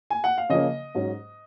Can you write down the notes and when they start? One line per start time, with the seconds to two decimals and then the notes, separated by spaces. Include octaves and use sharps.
0.10 G#5
0.24 F#5
0.38 F5
0.49 C#3 F3 A#3 C#4 D#5
0.95 G#2 F#3 C#4